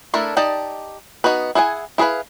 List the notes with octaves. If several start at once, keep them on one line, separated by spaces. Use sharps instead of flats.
A3 D4 E4 A4 A#4
D#4 G4 D5 D#5 A5
B3 D#4 F#4 B4
E4 G#4 F#5 G#5
E4 G#4 A#4 B4 F5